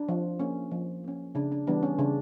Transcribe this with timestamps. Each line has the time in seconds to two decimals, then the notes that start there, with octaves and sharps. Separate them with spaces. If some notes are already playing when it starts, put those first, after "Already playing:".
Already playing: D4
0.09 F3
0.40 A#3 C#4
0.71 F3
1.04 A#3 C#4
1.35 C#3 D4
1.52 D4
1.67 E3 G3 B3 D4
1.83 C#4
1.99 C#3 D4